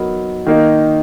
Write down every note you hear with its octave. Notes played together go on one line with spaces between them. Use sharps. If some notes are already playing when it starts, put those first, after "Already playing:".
Already playing: F#3 B3 D#4 A#4
D#3 A#3 D#4